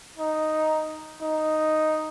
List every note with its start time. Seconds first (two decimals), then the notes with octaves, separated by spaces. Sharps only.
0.18 D#4
1.21 D#4